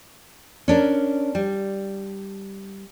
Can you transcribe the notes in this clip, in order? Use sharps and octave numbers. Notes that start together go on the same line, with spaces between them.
C#4 D4 A#4
G3